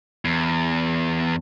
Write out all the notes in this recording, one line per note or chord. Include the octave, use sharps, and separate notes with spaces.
E2